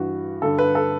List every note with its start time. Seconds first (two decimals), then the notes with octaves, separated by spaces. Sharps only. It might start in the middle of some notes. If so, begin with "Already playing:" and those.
Already playing: G2 E3 F#4
0.42 G2 D3 A4
0.59 B4
0.75 A4